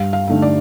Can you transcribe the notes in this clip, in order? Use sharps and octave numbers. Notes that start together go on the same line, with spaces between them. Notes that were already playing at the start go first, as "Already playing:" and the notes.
Already playing: G2 F5
F5
D3 A3 D#4
D5